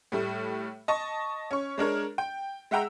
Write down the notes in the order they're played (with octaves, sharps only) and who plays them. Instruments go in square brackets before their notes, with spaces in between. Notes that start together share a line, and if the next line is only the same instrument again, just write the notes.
[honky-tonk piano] A2 G3 A3
D#5 A5 C#6
C#4 C#6
G#3 D4 A#4 C#5
G5
G#3 E5 F#5 G5 A#5 E6